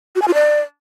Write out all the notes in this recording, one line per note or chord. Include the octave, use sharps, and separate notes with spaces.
F#4
G#5
F4
D5